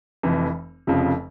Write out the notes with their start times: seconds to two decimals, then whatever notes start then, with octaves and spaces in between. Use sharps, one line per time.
0.23 F1 F2 E3
0.87 F1 F2 C#3 F3